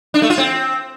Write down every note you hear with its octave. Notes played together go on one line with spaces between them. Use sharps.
D4
A3
F4
C4